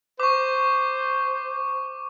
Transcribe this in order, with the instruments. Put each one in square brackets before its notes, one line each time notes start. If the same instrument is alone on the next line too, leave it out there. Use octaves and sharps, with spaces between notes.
[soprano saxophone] C5 [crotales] C#6 D6